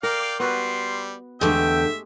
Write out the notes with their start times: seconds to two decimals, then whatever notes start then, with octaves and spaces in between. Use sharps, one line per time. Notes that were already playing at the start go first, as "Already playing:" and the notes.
0.03 A#4 D5 F5 G5
0.40 G3 B3 F#4 B4 C6
1.41 E2 D3 G#3 A3 G4 E5 G5